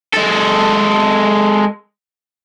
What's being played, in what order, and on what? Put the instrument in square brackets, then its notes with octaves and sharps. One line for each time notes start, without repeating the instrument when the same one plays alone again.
[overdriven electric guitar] G#3 A4